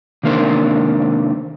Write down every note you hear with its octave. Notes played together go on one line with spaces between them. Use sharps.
C3 D#3 A#3 D4 C5